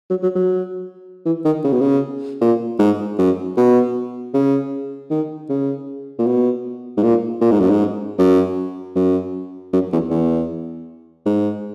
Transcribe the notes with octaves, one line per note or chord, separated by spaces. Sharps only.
F#3
F#3
F#3
E3
D#3
C#3
B2
C#3
A#2
G#2
F#2
B2
C#3
D#3
C#3
A#2
B2
G#2
A#2
A#2
G#2
F#2
G#2
F#2
F#2
F#2
E2
E2
G#2